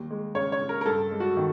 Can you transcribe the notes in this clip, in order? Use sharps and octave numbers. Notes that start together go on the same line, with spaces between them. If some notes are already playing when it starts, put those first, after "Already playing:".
Already playing: D#2 G3
G#3
C#3 C#5
C#5
C#3
A#4
A#4
G2 A4
G#3
F#4
D#3